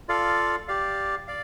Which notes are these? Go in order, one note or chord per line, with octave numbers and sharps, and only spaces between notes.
F4 A4 D5 F5
G4 D5 F5
D5 F5